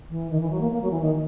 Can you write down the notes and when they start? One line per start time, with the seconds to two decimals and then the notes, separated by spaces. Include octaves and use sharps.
0.10 E3
0.30 D#3
0.40 E3
0.51 F#3
0.61 A#3
0.71 A#3
0.82 F#3
0.91 E3
1.01 D#3